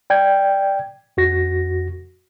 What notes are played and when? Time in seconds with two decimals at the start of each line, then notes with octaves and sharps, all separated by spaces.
0.10 D5 G5 G#6
1.17 F2 F#4 A#6